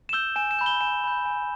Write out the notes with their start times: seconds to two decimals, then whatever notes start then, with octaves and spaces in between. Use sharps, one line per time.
0.09 E7
0.13 E6 G6 G7
0.36 G#5 E7
0.51 E7
0.59 B5 G6
0.66 G7
0.81 G#5 E7
1.04 B5 G6
1.25 G#5